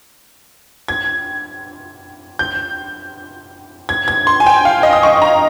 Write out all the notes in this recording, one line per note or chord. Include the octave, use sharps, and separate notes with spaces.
G#6
G6
G#6
G#6
C6
G#5
G5
F5
D#5
D#6
C#6
A#5